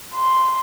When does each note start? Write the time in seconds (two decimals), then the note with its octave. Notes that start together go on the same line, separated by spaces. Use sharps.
0.15 C6